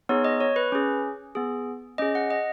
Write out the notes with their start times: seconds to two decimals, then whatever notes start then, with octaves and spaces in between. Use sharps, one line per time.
0.09 B3 D#4 G#4 C#5
0.24 D#5
0.41 C#5
0.56 B4
0.72 C#4 G#4
1.35 B3 G#4
1.98 C#4 G#4 D#5
2.15 F#5
2.30 D#5